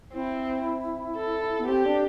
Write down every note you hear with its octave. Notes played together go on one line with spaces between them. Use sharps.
C4 E4
A4
B3
C4 G4
D4